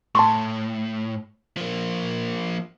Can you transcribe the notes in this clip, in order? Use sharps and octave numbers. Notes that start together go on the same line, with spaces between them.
A2 A5 C6 C#6
F3 A#3